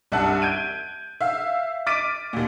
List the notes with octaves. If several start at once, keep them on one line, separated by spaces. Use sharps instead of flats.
C2 G2 E5 F#5 A5 F#6
G6 G#6 D7 D#7
E5 F5
D6 F6 A6 B6 D7 D#7
D#2 A#2